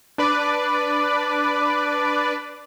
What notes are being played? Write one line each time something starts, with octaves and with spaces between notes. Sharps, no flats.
D4 B4 D5